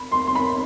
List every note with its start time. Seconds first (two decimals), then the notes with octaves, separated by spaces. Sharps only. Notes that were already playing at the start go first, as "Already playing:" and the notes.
Already playing: B5
0.12 C6
0.27 C6
0.35 B5